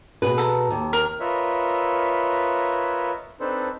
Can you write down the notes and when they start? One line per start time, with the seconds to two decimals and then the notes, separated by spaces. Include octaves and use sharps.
0.22 B2 G#4 B4
0.38 A4 A#5
0.70 D#2
0.93 A#4
1.19 F4 A#4 B4 C#5 D#5 E5
3.40 C4 D4 D#4 A4 B4 C5